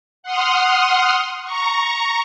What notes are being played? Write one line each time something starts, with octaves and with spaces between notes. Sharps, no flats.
F#5 C6 D#6 F6
A#5 C#6